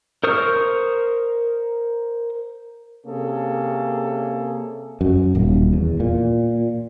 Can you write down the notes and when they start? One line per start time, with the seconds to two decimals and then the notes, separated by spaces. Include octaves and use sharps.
0.24 A#4 C5 C#6 D#6 F6
3.06 C3 A#3 C#4 G#4 A4
5.01 F#2
5.35 D#1
5.73 E2
6.00 A#2